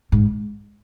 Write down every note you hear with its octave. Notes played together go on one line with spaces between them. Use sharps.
G#2